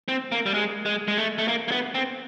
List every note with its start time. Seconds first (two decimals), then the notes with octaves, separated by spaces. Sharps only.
0.08 C4
0.32 A#3
0.46 G3
0.54 G#3
0.86 G#3
1.08 G#3
1.17 A3
1.38 A3
1.48 A#3
1.68 A#3
1.72 B3
1.95 C4